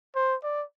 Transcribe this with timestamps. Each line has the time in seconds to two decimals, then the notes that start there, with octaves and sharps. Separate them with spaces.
0.15 C5
0.43 D5